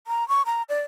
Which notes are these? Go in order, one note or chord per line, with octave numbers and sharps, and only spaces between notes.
A#5
C#6
A#5
D5